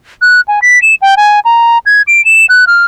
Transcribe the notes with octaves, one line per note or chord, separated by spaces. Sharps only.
F#6
G#5
B6
E7
G5
G#5
A#5
G#6
D7
E7
F#6
F6